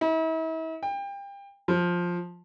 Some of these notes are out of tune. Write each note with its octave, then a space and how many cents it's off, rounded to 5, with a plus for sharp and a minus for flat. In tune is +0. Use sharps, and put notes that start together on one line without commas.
E4 -40
G5 +30
F3 +10